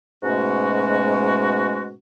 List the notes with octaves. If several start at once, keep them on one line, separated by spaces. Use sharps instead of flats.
G#2 B2 G#3 A3 C#4 F#4